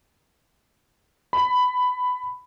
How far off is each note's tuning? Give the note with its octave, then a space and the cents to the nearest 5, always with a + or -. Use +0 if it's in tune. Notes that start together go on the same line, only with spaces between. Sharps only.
B5 +10